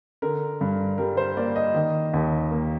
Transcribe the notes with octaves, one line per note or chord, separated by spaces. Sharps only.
D3 A#4
G2
G3 A#4
C5
A#3 D5
D#5
D#3
D#2
A#3